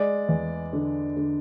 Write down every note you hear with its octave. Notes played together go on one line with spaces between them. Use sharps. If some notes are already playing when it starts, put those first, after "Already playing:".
Already playing: G#3 D5
E2
D3
D3